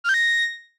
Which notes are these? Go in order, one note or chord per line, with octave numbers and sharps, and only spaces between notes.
F6
G6
A#6